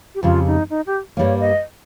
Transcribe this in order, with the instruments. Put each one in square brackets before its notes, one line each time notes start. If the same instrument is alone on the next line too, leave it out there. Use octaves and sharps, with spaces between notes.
[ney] G4
[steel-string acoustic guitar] F2 C#3 G3 [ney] F4
[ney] D#4
D#4
G4
[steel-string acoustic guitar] G2 G3 A#3 [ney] C#5
[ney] D#5